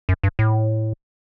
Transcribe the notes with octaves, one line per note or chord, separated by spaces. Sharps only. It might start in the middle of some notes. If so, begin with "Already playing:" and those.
F#2
G2
A2